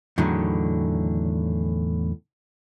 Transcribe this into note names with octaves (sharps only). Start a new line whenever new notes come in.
E2 A2 D3 D#3 F#3